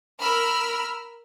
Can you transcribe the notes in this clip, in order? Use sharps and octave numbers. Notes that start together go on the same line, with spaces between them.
A#4 B5 E6 F6